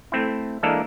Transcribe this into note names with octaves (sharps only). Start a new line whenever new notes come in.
A3 C4 E4
E3 G#3 A#3 D4 A4 A#4